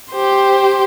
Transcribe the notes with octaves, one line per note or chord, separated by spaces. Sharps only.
G4 C5